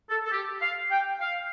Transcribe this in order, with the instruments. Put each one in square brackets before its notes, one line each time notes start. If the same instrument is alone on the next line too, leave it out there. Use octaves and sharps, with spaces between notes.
[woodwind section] A4
A4
G4
F5
G5
F5